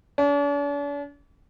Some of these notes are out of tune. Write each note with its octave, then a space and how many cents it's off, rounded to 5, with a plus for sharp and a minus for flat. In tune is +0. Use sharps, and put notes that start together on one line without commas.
D4 -45